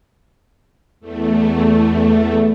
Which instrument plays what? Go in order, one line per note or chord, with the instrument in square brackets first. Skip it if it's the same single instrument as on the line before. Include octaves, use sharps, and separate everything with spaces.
[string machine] E2 A3